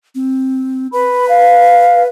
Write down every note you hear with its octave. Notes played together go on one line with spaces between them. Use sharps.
C4
B4 B5
F5